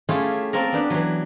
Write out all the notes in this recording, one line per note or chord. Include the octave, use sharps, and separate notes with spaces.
A3 C#4 E4 F4 G4 G#4
E5
A#3 C4 A4 A#4
B3 D4 G4 B4
E3 F#3